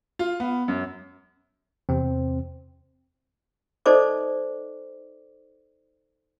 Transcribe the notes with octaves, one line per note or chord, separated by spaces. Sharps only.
F4
B3
F#2
E2 C3 C4
D#4 A4 C5 D5 D#5 D6